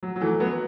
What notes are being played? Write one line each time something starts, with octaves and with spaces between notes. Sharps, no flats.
F#3
F#3
E3 A3
F#3 B3